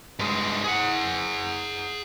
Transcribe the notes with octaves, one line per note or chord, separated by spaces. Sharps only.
G2 G#3
G#4 F#5